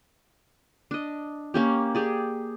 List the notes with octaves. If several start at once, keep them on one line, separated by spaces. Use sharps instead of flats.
D4 D#5
A#3 C#4 G4
G4 G#4 D5